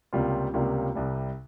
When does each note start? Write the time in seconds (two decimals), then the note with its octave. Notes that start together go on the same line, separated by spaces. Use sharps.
0.13 C#2 C3 G3 A#3 F4
0.54 C#2 C3 G3 A#3 F4
0.95 C2 C3 G3